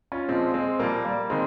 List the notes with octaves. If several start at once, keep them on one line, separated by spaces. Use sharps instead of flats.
C#4 F4
A#2 F3 G#3 C4
G#3 C4
A#2 F3 G3 A#3
G3 A#3
D#3 G#3 C4